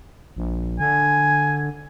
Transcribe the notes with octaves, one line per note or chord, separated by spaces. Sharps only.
A#1
D3 G#5